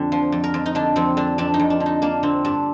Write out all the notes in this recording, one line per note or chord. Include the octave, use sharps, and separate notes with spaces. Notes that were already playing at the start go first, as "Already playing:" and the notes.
Already playing: F2 D3 G4
F3
F2
A#4
F2
D#4
D3 D4
F2 C4
D3 D4
F2 D4
D#4
F2
D4
D3
D#4
A#3 D4
D3 C4
G2 D4